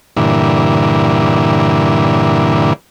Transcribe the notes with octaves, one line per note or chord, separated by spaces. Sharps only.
G2 A#2 D3 E3